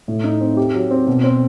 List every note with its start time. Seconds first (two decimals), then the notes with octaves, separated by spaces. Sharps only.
0.08 A2
0.24 D#4
0.41 C4
0.57 G4
0.74 F#3
0.91 C4
1.07 B2
1.24 C4